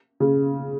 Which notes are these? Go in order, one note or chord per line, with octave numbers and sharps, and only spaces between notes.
C#3